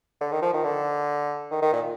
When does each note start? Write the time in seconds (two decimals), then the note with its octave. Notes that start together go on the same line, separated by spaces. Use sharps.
0.21 D3
0.32 D#3
0.42 F3
0.53 D#3
0.64 D3
1.51 D#3
1.62 D#3
1.73 A#2